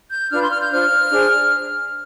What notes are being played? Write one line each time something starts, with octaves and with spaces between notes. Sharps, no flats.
G6
D4 F4 B4 F6
C6
F6
G6
D4 F4 C5 F6
D4 G#4 C5